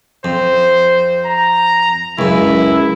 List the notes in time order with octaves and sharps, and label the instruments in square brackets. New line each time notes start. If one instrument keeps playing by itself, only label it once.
[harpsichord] F2 [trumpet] C5
[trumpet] A#5
[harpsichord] C#2 F#2 [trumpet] E4